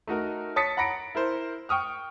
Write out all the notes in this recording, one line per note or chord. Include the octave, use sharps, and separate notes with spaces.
A3 D#4 F#4 A#4
C#5 A5 D#6 A6 B6 C#7
F#5 A#5 B5 A#6 C#7 D7
E4 A#4 C5
G5 C#6 D#6 F6